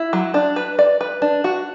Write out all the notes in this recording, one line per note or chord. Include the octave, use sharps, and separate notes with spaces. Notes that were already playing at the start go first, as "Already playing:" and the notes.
Already playing: E4
F#3
D4
B4
D5
B4
D4
F#4